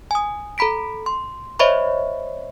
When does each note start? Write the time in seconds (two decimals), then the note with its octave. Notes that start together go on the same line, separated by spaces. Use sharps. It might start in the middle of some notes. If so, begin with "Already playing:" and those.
0.11 G#5 D#6
0.58 A4 A#5 B5 B6 D7
1.06 C6
1.59 C5 C#5 D#5 E5 B5 C#6